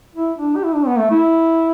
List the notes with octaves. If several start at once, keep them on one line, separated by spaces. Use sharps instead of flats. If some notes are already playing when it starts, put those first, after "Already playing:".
E4
D4
G4
E4
D4
B3
A3
E4